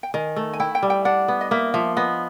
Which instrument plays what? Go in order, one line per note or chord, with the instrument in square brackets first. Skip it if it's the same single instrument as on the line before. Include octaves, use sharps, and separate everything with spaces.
[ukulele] G5
[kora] D#3 [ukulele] G#5
[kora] A3
[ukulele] G#5
[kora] E4 [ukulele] G5
[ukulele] G5
[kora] G3
[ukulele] G5
[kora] D4 [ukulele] F#5
[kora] B3
[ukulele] D#5
[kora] A#3 [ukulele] E5
[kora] F3 [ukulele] E5
[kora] B3 [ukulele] D#5